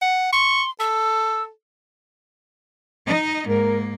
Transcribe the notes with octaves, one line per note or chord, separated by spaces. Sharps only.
F#5
C6 C#6
A4 E6
D#4 D#5
G#2 A#3 A#4